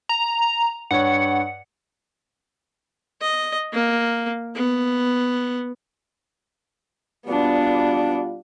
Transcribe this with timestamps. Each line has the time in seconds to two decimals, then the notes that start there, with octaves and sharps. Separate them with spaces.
0.09 A#5
0.91 G2 C#5 F#5
3.21 D#5
3.73 A#3
4.55 B3
7.26 B2 G3 B3 D4 F4